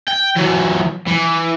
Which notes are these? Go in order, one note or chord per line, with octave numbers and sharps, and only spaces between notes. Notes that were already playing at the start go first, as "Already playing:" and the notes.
G5
E3 F#3
E3